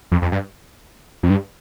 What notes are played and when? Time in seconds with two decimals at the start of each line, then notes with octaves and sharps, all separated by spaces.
0.12 F2
0.22 F2
0.32 G2
1.23 F2
1.30 G2